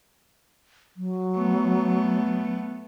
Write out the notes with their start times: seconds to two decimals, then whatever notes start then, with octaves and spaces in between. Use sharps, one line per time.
0.97 F#3
1.36 A3 B3